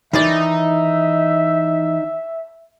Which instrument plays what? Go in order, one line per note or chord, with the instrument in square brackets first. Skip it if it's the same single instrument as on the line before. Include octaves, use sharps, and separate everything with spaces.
[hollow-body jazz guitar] D#3 E3 D5 [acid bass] D#4 [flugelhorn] E5